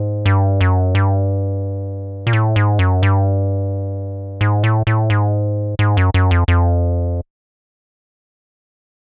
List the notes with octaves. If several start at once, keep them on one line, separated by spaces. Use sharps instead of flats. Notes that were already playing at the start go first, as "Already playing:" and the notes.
Already playing: G#2
G2
F#2
G2
A#2
A2
G#2
F#2
G2
G#2
A2
A2
G#2
G#2
F#2
F#2
F2
F2